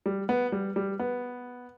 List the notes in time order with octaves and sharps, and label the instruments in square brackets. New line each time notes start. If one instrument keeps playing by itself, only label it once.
[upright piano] G3
B3
G3
G3
B3